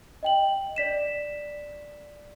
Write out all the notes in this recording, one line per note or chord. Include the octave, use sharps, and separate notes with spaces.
D#5 G5 F#7
D5 B6 E7